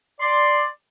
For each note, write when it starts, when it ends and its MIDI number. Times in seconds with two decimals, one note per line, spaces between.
0.20 0.63 74
0.20 0.63 84